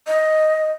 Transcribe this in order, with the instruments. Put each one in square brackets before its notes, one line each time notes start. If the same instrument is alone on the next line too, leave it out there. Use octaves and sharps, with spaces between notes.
[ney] D#5